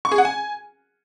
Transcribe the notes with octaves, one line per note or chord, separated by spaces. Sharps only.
C#6
G#4
F#5
G#5